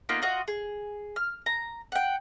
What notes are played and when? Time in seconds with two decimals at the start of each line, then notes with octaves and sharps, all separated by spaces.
0.09 A#3 B3 D#4 F4
0.22 F4 F#4 D#5
0.48 G#4
1.16 F6
1.46 A#5
1.92 F#5 G5